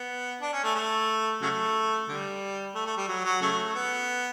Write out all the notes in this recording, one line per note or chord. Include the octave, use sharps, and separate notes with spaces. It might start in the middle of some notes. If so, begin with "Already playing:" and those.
Already playing: B3
D4
C#4
A3
A3
C#3 F#3 A3
D3 G3
A3
A3
G3
F#3
F#3
C#3 F#3 A3
B3